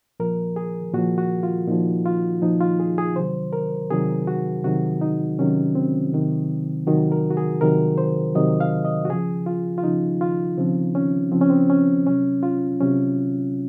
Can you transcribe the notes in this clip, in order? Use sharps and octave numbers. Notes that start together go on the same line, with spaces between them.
A#2 F3 A#4
G#4
A#2 F3 F#4
F#4
F4
A#2 F3 D#4
F4
A#2 F3 D#4
F4
G#4
G#4
C3 D#3 F#3 C5
A#4
C3 D#3 F#3 G#4
F#4
C3 D#3 F#3 F#4
D#4
C3 D#3 F#3 C#4
C4
C3 D#3 F#3
C3 D#3 F#3 F#4
A#4
F#4
G#4
C3 D#3 F#3 A#4
C5
C3 D#3 F#3 D#5
F5
D#5
F#4
C#3 F3 G#4
F4
F4
C#3 F3 D#4
F4
C#3 F3 C4
C#4
C#3 F3 C4
C#4
C4
C#4
C3 F#3 C#4
F4
C3 F#3 C#4